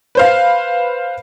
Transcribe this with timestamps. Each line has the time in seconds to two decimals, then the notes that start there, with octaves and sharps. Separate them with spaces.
0.15 B4 C5 F5